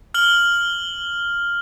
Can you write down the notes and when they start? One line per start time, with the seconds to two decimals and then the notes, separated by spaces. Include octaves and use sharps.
0.14 F6 F#7 G7